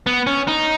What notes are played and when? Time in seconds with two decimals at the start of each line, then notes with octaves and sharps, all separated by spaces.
0.06 B3
0.27 C#4
0.48 D#4